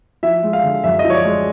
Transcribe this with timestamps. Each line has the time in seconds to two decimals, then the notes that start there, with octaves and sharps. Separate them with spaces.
0.23 F3 E5
0.43 G#3
0.53 F5
0.63 D3
0.84 F#2 E5
0.99 D#5
1.04 F3
1.10 C#5
1.15 D5
1.25 G#3